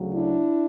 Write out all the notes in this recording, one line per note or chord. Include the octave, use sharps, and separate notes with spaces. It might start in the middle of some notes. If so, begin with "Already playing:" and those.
Already playing: D2 C#3 F#3
D4 E4